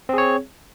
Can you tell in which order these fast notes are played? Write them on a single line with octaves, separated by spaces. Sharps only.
C4 G#4 C#5